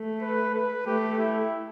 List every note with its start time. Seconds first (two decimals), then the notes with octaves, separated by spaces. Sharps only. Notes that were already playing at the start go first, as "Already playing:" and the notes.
Already playing: A3
0.22 B4
0.55 B4
0.86 A3 G4
1.19 E4